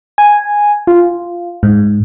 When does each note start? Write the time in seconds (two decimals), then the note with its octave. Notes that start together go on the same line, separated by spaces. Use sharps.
0.18 G#5
0.87 F4
1.63 G#2